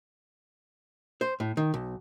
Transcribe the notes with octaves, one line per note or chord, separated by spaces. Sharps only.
C5
A2
D#3
B1